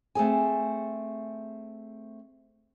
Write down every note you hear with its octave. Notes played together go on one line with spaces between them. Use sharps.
A3 C4 G#4 G#5